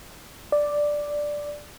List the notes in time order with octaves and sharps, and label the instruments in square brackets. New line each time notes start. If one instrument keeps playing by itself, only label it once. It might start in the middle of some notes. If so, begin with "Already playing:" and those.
[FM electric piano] D5